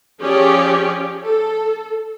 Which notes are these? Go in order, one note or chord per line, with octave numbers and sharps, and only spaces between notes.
F3 C#4 G4 G#4 C#5 D5
A4